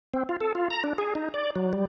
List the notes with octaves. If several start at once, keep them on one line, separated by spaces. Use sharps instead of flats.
C4
F4
A4
F4
A#5
D4
G#4
D#4
D5
F#3
G3